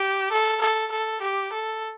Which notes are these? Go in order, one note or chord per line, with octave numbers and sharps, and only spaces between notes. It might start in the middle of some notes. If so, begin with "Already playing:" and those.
Already playing: G4
A4
A4
A4
G4
A4